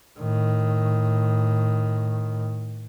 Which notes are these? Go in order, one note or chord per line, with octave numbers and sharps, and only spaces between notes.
A2 D#3